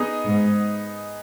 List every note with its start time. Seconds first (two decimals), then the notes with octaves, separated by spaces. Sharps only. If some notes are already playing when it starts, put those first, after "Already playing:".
Already playing: B3 D#4 G#4 D#5
0.25 G#2